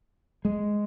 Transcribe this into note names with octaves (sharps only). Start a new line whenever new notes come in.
G#3